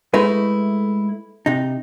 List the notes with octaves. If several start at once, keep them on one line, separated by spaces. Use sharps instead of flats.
G#3 A3 D#4 E4 B4
C3 D#4